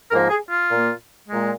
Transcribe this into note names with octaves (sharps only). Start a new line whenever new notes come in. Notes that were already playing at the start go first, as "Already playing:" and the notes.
G#2 F3 A#3 A#4
G#4
F4
A#2 A#3
A#2 G#3